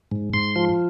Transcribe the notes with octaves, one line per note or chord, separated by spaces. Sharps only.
G#2
G#2 C6
F3